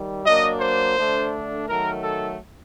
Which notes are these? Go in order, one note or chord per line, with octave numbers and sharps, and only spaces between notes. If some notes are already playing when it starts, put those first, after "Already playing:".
Already playing: D#3 G3
F#3 A#3 D4 D#5
C5
D3 A3 D4
D#3 F#3 A3 A#4
A4